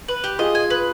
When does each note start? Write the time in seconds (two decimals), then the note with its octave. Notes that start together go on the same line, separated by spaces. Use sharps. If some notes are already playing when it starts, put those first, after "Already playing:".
0.08 B4
0.24 G4
0.39 F4 G#4 D#5
0.55 G#5
0.70 B4